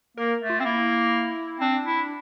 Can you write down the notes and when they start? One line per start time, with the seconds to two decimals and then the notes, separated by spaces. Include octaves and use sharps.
0.17 A#3 A#4
0.41 A3
0.50 F4
0.60 C4
0.65 A#3 E4
1.60 C4 D4
1.85 E4